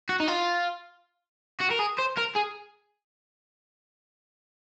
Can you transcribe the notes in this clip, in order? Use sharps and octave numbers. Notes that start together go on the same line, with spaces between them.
F#4
D#4
F4
F#4
A#4
G#4
C5
A#4
G#4